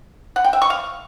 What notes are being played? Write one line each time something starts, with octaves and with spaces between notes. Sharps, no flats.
F#5
G5
E5
C#6
F5